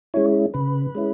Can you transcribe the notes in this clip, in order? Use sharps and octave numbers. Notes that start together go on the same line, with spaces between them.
G#3 C#4 E4 C#5
C#3 B4
G#3 C#4 E4